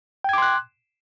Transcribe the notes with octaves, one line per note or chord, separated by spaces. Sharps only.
G5 C6 D6 F#6 G#6